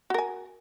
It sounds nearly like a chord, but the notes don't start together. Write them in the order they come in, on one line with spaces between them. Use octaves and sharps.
F#4 A#4 G#5